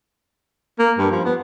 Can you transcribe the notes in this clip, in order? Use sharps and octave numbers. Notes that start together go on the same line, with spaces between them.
A#3
G2
F3
B3